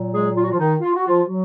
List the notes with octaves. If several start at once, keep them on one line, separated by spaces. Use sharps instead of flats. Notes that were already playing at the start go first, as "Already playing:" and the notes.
Already playing: A#2 F#3
G#3 G#4
F4
F#4
F3 F4
D#3 D#4
F4
F#4
F3 F4
F#3 F#4